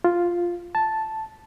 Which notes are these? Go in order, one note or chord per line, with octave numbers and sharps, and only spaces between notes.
F4
A5